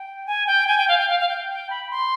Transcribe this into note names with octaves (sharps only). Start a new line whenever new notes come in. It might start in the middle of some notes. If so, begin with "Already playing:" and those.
Already playing: G5
G#5
G5
G#5
G5
F5
G5
F5
F5
G5
G5
B5
C6